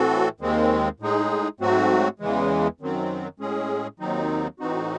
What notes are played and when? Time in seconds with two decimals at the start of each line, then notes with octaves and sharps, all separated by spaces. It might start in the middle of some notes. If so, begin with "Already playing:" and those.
Already playing: A2 E3 C4 F#4 A4
0.40 D#2 D#3 G#3 C4
1.00 A2 G#3 D#4 G#4
1.60 G#2 F#3 A3 C4 F#4
2.20 E2 C#3 E3 G#3
2.80 F#2 D#3 F#3 C4
3.40 A2 G#3 C#4 G#4
4.00 D#2 D#3 F#3 C4 D#4
4.60 A2 E3 C4 D#4 F#4